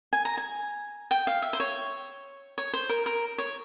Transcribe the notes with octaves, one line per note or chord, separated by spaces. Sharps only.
G#5
A#5
G#5
G5
F5
E5
C5
C#5
C#5
C5
A#4
A#4
C#5